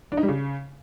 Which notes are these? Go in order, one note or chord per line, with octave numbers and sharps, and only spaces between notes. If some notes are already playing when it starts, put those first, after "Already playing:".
D4
D#4
G3
C#3